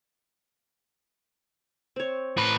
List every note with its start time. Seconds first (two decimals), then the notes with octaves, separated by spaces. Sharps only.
1.96 C4 C#5
2.37 A2 B4